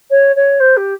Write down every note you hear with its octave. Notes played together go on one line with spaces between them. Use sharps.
C#5
C#5
C5
G4